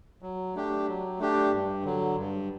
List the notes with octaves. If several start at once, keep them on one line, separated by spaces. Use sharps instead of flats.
F#3
A3 D4 G4
F#3
A3 D4 G4
G2
D3 F#3
G2